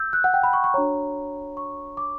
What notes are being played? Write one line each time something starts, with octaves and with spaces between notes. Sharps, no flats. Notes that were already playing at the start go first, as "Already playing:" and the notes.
Already playing: E6 G6
F#6
F#5
G5
B5
C#6
C#6
D4 F#4 C#5 A#5
C#6
D6